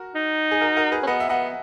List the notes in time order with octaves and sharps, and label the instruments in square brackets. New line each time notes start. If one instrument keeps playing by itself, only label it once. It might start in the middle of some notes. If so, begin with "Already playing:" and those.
Already playing: [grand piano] F#4 A#4
[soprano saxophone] D#4
[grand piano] G#4
F#4 A#4
F#4 A#4
G#4 B4
[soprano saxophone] C#4
[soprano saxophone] B3 [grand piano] B4 D#5
[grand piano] E5
[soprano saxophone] B3 [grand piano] D#5 F#5